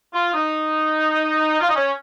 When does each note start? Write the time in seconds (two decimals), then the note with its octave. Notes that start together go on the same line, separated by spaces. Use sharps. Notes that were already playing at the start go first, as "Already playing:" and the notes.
0.13 F4
0.33 D#4
1.60 F4
1.68 D#4
1.75 C#4